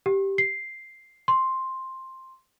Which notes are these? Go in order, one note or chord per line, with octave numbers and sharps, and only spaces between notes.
G4
C7
C6